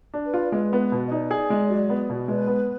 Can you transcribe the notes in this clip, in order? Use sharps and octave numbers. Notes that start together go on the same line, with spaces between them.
D4
B4
F4
D5
G#3 B4
B3
B2
D#5
D#4 D5
G#4
G#3
F#3
B3
B2
G#3 B4
B3